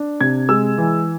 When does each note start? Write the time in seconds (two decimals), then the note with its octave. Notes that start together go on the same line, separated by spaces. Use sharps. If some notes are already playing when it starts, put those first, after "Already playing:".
Already playing: D4
0.20 C3 G#6
0.49 G#3 E6
0.78 E3